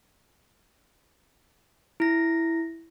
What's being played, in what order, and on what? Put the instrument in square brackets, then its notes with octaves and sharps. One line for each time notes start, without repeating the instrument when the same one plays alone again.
[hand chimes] E4 A#6